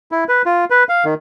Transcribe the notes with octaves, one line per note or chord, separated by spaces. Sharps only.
E4
B4
F4
B4
F5
D#3